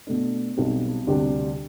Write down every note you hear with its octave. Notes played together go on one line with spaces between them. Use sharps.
B2 A3 D4
B1 B2 G3 C4
D2 C3 G3 D4 G4